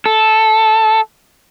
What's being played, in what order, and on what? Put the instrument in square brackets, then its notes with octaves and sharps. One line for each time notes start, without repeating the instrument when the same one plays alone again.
[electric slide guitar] A4